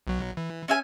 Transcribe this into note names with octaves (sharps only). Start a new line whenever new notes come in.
B1 F#3
E3
C#4 E5 G#5